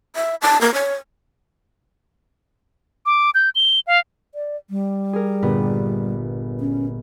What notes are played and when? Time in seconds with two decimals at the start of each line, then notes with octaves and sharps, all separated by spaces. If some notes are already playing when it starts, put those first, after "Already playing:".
0.16 E5
0.42 A5
0.61 A#3
0.74 C#5
3.06 D6
3.35 G6
3.55 G7
3.87 F5
4.35 D5
4.70 G3
5.13 G#4 A#4
5.43 G1 A#2 B3
6.60 C#4